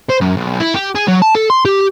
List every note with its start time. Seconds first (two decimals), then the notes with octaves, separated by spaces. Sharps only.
0.09 C5
0.21 F#2
0.37 B1
0.60 E4
0.75 G4
0.95 G#4
1.08 F#3
1.22 A5
1.35 A4
1.50 C6
1.65 G4